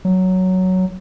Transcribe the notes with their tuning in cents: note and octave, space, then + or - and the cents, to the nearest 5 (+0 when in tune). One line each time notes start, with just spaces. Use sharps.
F#3 +5